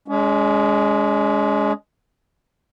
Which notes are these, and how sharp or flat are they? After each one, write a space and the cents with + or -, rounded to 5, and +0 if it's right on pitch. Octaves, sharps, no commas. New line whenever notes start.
G#3 +0 C#4 +45